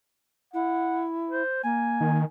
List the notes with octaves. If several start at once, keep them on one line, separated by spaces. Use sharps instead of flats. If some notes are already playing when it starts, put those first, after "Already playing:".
E4 F#5
C5
A#3 G#5
D#3